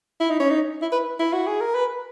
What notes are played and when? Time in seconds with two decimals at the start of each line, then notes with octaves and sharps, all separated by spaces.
0.20 E4
0.30 D#4
0.40 C#4
0.50 D#4
0.82 E4
0.92 B4
1.19 E4
1.33 F#4
1.47 G#4
1.61 A#4
1.75 B4